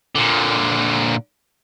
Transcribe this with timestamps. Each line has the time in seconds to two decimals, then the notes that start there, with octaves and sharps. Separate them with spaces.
0.15 A#2 D3